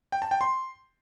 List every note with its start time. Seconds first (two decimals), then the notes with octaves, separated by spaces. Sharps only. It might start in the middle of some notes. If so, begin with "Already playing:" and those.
0.12 G5
0.22 A5
0.31 G5
0.41 C6